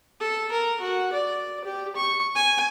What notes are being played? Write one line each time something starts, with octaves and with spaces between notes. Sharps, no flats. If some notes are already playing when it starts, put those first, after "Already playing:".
A4
A#4
F#4
D5
G4
C#6
G#5